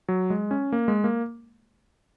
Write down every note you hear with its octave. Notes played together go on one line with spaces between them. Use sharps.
F#3
G#3
C#4
A#3
G#3
A#3